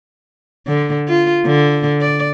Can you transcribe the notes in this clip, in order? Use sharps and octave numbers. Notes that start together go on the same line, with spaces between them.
D3
F4
D3
D5